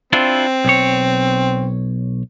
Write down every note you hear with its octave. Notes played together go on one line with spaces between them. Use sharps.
C4 D4 E4 F4
B1 C#5